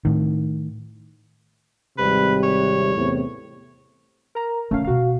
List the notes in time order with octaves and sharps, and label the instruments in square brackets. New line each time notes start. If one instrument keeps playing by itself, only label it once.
[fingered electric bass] A2 D#3
[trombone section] G#1 C3 G3 [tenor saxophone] B4
[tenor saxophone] C#5
[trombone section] E2 A2 C3
[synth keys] A#4 A#5
[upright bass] D3 D#3 [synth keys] A3 C#4 F5
[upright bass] D#1 B2 [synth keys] F#4 F5